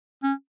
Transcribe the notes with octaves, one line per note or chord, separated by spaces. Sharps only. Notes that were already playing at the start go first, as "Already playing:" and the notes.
C#4